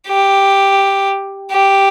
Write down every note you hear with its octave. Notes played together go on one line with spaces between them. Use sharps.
G4
G4